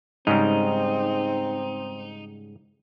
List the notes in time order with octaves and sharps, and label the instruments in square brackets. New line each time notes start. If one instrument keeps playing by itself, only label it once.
[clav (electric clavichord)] G#2 C#3 G3 [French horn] C4 [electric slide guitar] D#4